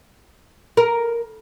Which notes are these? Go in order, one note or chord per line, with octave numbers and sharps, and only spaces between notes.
A#4